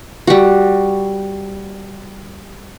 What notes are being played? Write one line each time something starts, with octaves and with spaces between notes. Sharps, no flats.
G3 F#4